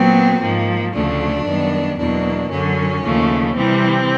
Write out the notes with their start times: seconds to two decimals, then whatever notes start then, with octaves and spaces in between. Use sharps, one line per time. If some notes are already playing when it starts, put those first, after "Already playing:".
Already playing: A#2 F#3 B3 C4
0.41 G#2 F3 A#3
0.93 D2 C#3 F3 A3 D4
1.46 F#2 D#3 G3 B3
1.98 E2 B2 F#3 A#3 D4
2.50 F#2 D3 F#3 C#4
3.03 D#2 C#3 F3 A3
3.55 C3 E3 G3 C4